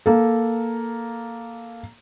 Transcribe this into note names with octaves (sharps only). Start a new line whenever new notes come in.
A#3 A4